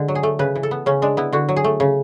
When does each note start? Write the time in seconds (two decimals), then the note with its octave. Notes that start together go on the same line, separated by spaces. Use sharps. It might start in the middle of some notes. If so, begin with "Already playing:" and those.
Already playing: D3 G#3
0.08 F#3
0.15 G#4
0.23 A3
0.39 C#3 B4
0.56 E3
0.63 A4
0.71 B3
0.86 C#3 C#4
1.02 G#3 D4
1.17 B3 E4
1.32 D3 F#4
1.49 F#3
1.56 G#4
1.64 A3
1.80 C#3